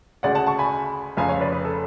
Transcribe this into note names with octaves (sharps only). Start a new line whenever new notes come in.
D2 C#3 G#3 D5 F#5
F#5 A5
A5 C#6
G#5 B5
F1 F2 C#3 F5 G#5
C#5 F5
B4 D5
B4
A4